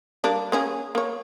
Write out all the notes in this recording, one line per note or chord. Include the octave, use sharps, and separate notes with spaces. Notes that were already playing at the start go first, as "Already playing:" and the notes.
G3 A#3 D4
A#3 C#4 G#4
A#3 C#5